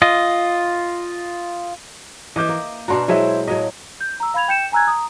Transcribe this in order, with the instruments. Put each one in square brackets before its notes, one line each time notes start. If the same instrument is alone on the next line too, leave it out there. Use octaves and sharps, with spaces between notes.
[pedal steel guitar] F4 D#5
[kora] E3 E5 [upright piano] D#5 D6 G6
[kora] A#3
[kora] B2 D4 F#4 [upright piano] A#5 C6
[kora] F#3 G#3 D#5 [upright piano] E4 C5 E5
[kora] A2 F#3 A#3 [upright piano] D#5
[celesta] G6
A#5 E6
F5 B5 G#6 F7
G5 G6 C#7 E7
G#5 A#5 E6 F#6 G#6
A#5 D#6